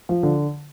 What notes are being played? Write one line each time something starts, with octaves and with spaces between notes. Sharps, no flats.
F3
D3